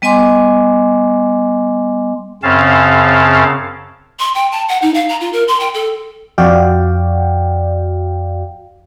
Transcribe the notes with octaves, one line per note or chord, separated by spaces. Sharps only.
G3 B3 D#5 G#5 C6 D6
F#2 C#3 C4 C#4 F5 A5
C6
G5
A5
F#5
D#4
F5
A#5
F4
A#4
C6
G5
A4
F2 F#4 D5 F5 G5